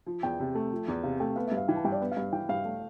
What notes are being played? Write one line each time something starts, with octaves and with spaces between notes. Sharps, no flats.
F3
E2 G5
C3
A3
F3
E2
C3 F5
A3 G5
B3 F5
E5
G2
F5
E3 G5
A5
G2 G5
D5
B3
F5
G2
E3 G5
G2 F5
A3